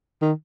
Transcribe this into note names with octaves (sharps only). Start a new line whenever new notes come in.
D#3